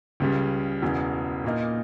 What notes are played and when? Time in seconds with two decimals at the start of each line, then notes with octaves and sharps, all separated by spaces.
0.20 C#2 C#3 G3
0.82 E1 E2 C#3
1.44 A#2 A#3 D#4